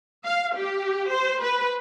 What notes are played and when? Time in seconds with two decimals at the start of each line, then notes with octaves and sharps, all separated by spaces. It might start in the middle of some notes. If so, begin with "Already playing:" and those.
0.25 F5
0.57 G4
1.10 C5
1.41 B4